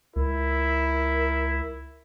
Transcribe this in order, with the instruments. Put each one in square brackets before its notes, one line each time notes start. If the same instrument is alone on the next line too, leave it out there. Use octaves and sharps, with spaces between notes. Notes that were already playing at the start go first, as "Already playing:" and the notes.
[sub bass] C#2 [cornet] E4 [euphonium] A#4